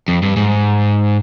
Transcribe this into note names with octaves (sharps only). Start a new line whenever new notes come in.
F2
G2
G#2